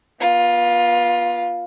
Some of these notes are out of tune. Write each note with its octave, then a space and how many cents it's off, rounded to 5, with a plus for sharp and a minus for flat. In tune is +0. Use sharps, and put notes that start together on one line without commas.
B3 -35 F4 +10